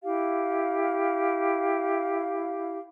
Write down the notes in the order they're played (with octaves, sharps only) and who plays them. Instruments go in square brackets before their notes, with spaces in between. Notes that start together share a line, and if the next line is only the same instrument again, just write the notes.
[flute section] E4 G4 F5